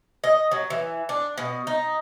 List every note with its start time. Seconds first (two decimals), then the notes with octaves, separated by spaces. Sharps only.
0.24 D#5
0.52 F#3
0.70 E3
1.09 D4
1.38 B2
1.67 D#4